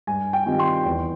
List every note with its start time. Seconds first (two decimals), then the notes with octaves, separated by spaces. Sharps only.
0.07 G2 G#5
0.33 G5
0.46 D#3 G3 C4 F4
0.59 C6
0.85 E2